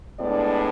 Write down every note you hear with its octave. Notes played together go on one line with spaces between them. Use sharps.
A2 G#3 B3 D4 D5